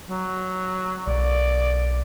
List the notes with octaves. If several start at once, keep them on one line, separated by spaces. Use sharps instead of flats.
F#3
B1 D5